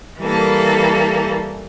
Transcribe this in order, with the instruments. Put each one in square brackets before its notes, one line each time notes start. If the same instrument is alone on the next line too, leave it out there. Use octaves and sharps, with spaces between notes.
[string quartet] E3 G3 A#3 A4